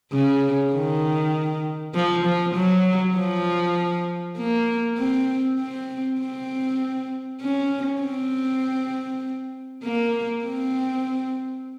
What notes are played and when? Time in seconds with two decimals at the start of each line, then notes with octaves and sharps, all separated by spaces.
0.12 C#3
0.73 D#3
1.95 F3
2.25 F3
2.55 F#3
3.15 F3
4.37 A#3
4.98 C4
5.59 C4
6.20 C4
7.41 C#4
8.02 C4
9.83 A#3
10.44 C4